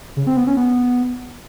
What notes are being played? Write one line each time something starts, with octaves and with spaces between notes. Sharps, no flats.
C#3
C4
B3
C#4
B3